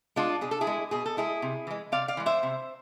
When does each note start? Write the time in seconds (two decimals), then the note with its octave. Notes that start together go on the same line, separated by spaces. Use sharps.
0.16 G#3 D4 F4
0.41 B2 G#4
0.51 A4
0.61 E4 G#4
0.67 G#3
0.91 B2 G#4
1.06 A4
1.17 G#3 E4 G#4
1.42 C3
1.67 E3 G#3
1.92 C3 D5 F5
2.08 D5 F5
2.17 E3 G#3
2.26 C5 E5
2.43 C3